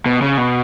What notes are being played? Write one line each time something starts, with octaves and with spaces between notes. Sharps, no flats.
B2
C#3
B2